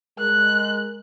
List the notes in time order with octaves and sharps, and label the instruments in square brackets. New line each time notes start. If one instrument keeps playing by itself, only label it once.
[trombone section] G#3 A#4 [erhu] F#6